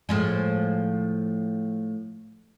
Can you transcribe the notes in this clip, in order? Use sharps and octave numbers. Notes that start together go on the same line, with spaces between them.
A2 F3 G#3